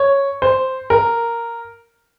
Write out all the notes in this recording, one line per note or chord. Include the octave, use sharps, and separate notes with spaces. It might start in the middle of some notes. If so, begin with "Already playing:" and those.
Already playing: C#5
C5
A#4